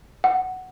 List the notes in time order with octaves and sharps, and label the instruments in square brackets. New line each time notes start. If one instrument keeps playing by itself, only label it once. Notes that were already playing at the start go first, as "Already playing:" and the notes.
[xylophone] F#5